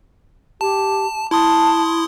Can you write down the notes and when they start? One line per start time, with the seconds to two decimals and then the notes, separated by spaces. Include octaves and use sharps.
0.61 G4 A5
1.31 E4 A5 C6 D#6